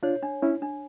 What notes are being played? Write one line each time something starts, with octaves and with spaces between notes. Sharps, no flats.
D4 F4 C#5
D4
C#4 D4 E4
D4